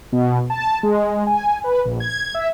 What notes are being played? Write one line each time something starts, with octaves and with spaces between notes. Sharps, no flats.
B2
A5
G#3
G#5
B4
A#1
G#6
E5